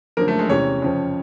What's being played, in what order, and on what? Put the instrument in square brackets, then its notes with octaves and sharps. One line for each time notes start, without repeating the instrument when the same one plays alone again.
[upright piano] F#2 D3 F3 A#3 A#4
A3 A4
G#3 G#4
E2 C3 E3 C#4 C#5
F2 C#3 F3